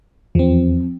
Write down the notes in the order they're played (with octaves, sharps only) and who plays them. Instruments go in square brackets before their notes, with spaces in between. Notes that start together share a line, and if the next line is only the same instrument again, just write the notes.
[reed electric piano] E2 [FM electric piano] F3 C4